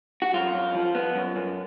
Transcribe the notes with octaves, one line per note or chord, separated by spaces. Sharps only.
F#4
F#2 F4
F#2
F3
B3
F#2
F#2